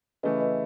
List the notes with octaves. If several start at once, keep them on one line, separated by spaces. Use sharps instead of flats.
C#3 E3 A3 E4 B4 D#5
B4 D#5